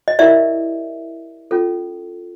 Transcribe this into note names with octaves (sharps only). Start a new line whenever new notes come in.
D#5
E4 G4 A#4 D5 E5
C#4 F4 A4